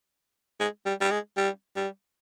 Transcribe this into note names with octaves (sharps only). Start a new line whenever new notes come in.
G#3
G3
G3
G#3
G3
G3